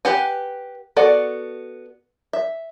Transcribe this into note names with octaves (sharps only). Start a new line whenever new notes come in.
G4 B4 F#5 G#5
B3 F#4 A4 D5 F#5
E5